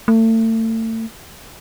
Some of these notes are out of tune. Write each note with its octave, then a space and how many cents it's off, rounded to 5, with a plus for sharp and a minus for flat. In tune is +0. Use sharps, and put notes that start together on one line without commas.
A3 +35